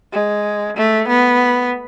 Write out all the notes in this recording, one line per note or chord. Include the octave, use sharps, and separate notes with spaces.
G#3
A3
B3